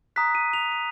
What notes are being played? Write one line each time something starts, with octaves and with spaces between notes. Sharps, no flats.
A#5 D#6 F#6 B6
D#7
F7
D#7